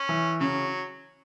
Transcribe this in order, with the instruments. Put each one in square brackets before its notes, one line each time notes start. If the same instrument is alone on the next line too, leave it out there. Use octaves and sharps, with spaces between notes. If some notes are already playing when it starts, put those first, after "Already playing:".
Already playing: [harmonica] C#4
[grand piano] E3
[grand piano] C#3 [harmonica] F#3